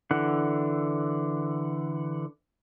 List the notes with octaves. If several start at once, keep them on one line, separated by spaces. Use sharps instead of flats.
D3 E3 F#5